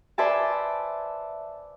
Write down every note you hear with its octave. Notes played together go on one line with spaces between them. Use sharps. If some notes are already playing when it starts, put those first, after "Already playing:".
B4 C5 D5 E5 G#5 A5